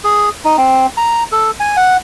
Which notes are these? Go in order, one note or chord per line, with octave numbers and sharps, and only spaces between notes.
G#4
D#4
C4
A#5
A4
G#5
F#5